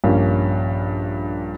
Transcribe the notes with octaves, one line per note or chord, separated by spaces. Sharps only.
A#1 G2 A#3 C#4 G4 F5